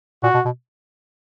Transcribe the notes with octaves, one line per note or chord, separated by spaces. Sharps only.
A#2 F#4
B2
B2